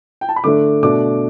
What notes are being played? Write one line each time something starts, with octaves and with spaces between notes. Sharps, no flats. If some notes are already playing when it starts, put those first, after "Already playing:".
G5
A5
B5
D3 A3 D4 D6
B2 A3 D4 D6